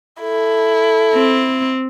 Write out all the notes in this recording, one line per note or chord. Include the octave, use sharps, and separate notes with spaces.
E4 A4
C4